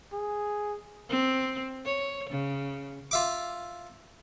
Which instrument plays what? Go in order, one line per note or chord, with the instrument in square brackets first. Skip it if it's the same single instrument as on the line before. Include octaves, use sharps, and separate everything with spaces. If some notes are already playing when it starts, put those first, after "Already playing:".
[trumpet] G#4
[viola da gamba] C4
C#5
C#3
[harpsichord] F4 E5 D6